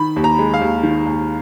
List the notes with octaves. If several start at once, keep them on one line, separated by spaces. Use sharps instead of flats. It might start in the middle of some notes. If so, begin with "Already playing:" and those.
Already playing: D#3 B5
D#2
A#5
G#3
F5
D#2
D#3
D#2